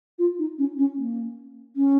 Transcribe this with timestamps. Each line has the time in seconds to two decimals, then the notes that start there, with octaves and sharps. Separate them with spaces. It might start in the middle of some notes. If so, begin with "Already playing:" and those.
0.19 F4
0.39 D#4
0.58 C#4
0.78 C#4
0.97 A#3
1.76 C#4